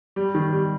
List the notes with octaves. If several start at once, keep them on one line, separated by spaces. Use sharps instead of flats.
G3
D#3
G3